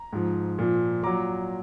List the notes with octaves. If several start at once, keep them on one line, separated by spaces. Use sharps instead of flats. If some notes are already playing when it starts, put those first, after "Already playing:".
Already playing: A#5
G#2 F3
A#2 F3
A#2 F#3 A#5 D6